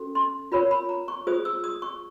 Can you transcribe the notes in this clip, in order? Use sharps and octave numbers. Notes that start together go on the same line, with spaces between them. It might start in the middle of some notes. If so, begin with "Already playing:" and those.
Already playing: C#4 F#4 A4
C6
F4 A#4 C#5 B5
B5
A#5
C#6
F4 G#4 C5 D#6
E6
D#6
C#6